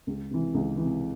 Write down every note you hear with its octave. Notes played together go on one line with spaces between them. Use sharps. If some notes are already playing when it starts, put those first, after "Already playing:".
C#2
C3 E3
C#2
C3 E3